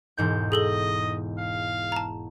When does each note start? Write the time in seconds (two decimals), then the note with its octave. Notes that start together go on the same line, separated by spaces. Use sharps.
0.17 E1 G#2 G6
0.52 G#4 A4 D#5 G7
1.39 F5
1.92 A5 A#5